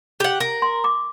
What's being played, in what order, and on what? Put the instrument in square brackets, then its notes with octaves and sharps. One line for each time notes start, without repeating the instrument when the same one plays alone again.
[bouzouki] G4 F#5
A#4
[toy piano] C6
D6